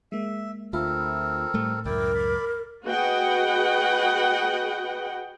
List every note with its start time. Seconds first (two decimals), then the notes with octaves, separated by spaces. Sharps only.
0.12 G#3 A#3 E5
0.73 D2 C4 F4 A4 A#4 E5 B5
1.54 A2 G3 A3
1.85 C#2 F#2 E4 A#4 D5 G5
2.15 D5 B5
2.86 F#4 G#4 B4 D#5 F#5 G5